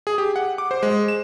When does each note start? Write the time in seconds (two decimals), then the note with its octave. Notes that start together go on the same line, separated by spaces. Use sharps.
0.07 G#4
0.18 G4
0.36 F#5
0.58 D6
0.71 C5
0.83 G#3
1.08 E7